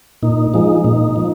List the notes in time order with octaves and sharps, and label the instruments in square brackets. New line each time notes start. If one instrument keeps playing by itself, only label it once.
[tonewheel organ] A#2 D#4
F3 G#3 D#4
A#2 D#4
F3